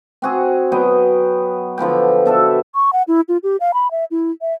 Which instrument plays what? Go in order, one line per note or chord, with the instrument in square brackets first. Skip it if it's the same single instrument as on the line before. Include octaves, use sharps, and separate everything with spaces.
[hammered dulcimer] C4 F#4 G#4
F#3 B3 D#5 G5
D3 F3 B3 G5
B2 A4 E5
[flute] C#6
F#5
E4
F4
G4
F5
B5
E5
E4
E5